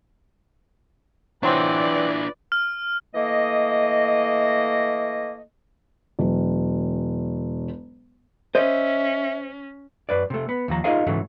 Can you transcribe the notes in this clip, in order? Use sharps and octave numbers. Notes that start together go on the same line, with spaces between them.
E3 F#3 C4 D4 F4 B4 D5
F6
E3 A3 A#3 D#5
E1 F#3
C#4 C5 D#5 E5
F#2 B4 D5
C3 A3
B3
D#2 F3 A#5
D#4 F4 G#4 A#4 D#5 F5
G#2 C#3 E3 F#3 A3